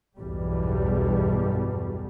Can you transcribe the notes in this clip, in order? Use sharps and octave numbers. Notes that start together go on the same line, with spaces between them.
B1 E2 G2 B2 G3